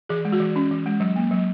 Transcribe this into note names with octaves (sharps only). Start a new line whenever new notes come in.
E3 G#4
G#3
F#4
E3
C#4
E3
G#3
F#3
A#3
F#3